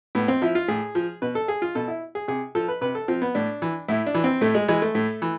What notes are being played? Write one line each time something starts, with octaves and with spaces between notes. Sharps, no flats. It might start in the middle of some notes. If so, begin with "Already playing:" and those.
A2 B3
C4
F3 E4
F4
A2 G#4
F3
B2 B4
A4
G#4
F4
B2 A4
E4
G#4
C3 G#4
F3 A4
B4
C3 B4
A4
F3 C4
B3
A2 D4
E3
A2 E4
D4
E3
C4
A2 A3
G#3
E3 G#3
A3
A2
E3